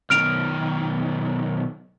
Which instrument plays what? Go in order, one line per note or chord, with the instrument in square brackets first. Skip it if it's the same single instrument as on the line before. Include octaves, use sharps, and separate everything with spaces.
[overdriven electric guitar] B1 D#3 [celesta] F6 D7 F7